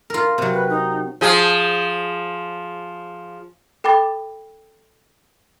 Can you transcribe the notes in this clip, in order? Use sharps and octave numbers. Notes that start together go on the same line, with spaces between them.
F4 A#4
C3 F#3
B4
D#4
F3 G#4
A4 G5 B5 D6 A6